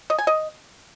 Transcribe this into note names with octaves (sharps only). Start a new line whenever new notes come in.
D#5
G#5
D#5